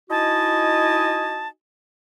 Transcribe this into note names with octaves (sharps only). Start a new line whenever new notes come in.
D#4 E4 F#4 D#5 G#5 A5